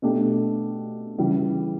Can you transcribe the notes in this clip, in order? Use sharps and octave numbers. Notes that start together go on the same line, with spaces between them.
B2 A3 D4 G4
C#3 E3 G3